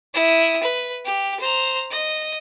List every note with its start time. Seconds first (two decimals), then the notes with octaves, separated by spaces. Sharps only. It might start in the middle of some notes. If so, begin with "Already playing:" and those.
0.14 E4 D#6
0.63 B4
1.05 G4
1.39 C5 A#5
1.91 D#5